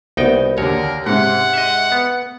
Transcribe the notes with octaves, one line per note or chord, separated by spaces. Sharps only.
C2 B3 D#4 F#4 G5
D#2 D3 A#4 C#5
G#2 C3 F#5
D#5 E5
B3